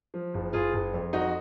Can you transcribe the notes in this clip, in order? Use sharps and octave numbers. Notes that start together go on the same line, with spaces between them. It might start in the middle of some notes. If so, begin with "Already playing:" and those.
F3
F#1
F#1 F4 G#4
F#1
F2
F2 D#4 F#4